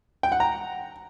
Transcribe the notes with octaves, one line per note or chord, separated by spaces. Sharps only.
G5
F#5
A#5